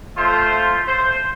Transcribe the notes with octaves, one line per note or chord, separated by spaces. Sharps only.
A3 F4 C5
C5